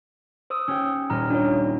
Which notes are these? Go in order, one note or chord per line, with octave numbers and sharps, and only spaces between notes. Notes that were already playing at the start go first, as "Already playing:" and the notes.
C5 D#6 E6
C#4 G4 G5
D#1 D#5 A#5 F6
D4 F4 C#5